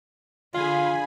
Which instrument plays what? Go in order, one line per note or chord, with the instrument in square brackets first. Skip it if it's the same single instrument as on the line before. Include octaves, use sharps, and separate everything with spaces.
[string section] D3 G#4 [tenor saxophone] F4 [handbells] F5 [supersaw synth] G#5 B5